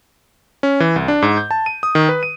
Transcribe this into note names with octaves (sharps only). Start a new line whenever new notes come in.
C#4
E3
C2
D4
G#2
G6
A5
D#7
D#6
D#3
B4
D#7